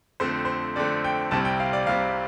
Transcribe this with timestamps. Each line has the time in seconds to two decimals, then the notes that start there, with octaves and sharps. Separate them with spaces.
0.20 F2 D3 A3 C4 C5
0.45 C5
0.76 F2 D3 A3 C4 D5
1.04 G5
1.31 C2 C3 G3 C4 A5
1.45 G5
1.60 F5
1.73 D5
1.87 C2 C3 G3 C4 F5